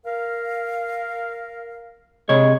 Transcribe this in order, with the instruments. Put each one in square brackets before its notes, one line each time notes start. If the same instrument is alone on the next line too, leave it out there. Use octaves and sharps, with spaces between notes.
[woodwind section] A#4 F5
[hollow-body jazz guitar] C3 C#5 [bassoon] G#3